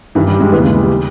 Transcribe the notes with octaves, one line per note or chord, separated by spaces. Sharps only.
G2 D#3 E3
G3
G#3
D#2 C#3 E3 B3
G#3
G3
D#3